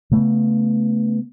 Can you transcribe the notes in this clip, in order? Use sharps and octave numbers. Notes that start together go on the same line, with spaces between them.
C#3 A3 B3